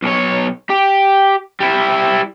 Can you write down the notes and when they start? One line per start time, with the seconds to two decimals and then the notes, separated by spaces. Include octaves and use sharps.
0.02 B1 C#5
0.70 G4
1.60 G3 E4